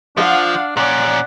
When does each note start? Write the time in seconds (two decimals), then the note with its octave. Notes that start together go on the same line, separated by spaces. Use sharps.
0.17 F3 D4 F5 F#5
0.77 A#2 C#4 D5 F#5